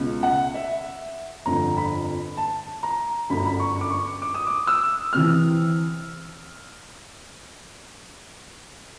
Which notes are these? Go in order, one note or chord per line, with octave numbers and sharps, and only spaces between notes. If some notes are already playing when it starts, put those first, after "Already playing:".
Already playing: C#2 B2
F#5
E5
G1 F2 D3 A#5
B5
A5
A#5
G1 F#2 D3 B5
A#5
B5
C#6
D6
C#6
D6
D#6
D6
E6
C3 E3 F6